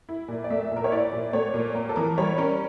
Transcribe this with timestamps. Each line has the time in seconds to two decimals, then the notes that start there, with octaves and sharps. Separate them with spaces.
0.09 E4
0.28 A#2
0.44 D5
0.50 A3 E5
0.71 A#2
0.76 A#4
0.84 C#5
0.92 E4 D5
1.12 A#2
1.33 A3 C#5
1.54 A#2
1.75 A#3 A#4
1.89 A4
1.96 E3 A#4
2.18 G3 C#5
2.38 C#4 A#4